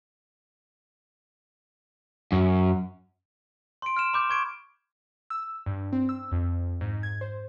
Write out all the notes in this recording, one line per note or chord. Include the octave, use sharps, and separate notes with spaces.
F#2
C6 D7
F6 D7 E7
B5 D6 G6
C#6 G#6 D7
E6
G2
C4
E6
F2
G#2
G#6
C5